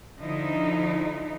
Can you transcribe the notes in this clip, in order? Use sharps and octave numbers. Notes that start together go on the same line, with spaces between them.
D3 F3 D#4 E4